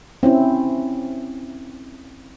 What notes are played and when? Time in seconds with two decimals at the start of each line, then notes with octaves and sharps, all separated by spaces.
0.23 C4 C#4 E4